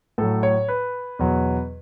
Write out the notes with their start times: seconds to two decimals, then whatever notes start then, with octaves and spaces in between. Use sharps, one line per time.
0.18 A2 F#3 A4
0.43 C#5
0.68 B4
1.19 E2 B2 F#3